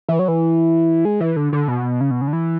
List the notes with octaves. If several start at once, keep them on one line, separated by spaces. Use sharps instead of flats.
E3
F#3
E3
G#3
E3
D3
D3
B2
C#3
B2
C#3
D3
E3